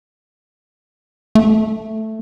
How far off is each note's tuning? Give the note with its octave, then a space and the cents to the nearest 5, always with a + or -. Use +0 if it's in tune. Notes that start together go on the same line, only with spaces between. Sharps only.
A3 +0